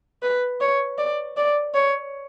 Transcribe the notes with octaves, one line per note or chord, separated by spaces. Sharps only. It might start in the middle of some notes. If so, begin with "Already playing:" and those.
B4
C#5
D5
D5
C#5